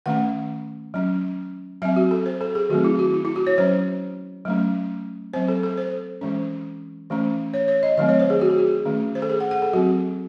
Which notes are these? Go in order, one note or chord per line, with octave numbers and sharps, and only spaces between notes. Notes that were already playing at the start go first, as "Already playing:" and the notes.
D#3 A3 C#4 F#5
F#3 C#4
F#3 C4 E5
F#4
A4
C5
A4
G#4
D#3 F#3 A3 C4 F#4
E4
F#4
E4
E4
F#4
C#5
F#3 C#4 C5
F#3 A3 C#4
F#3 C4 C5
A4
A4
C5
E3 G#3 C#4
E3 A3 C#4
C#5
C#5
D#5
D#3 F#3 A3 C4 D#5
C#5
C5
G#4
F#4
G#4
F#4
D#3 A3 C#4
C5
A4
G#4
F#5
F#5
A4
F#3 C4 F#4